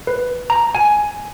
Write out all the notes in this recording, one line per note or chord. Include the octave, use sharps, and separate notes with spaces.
B4
A#5
G#5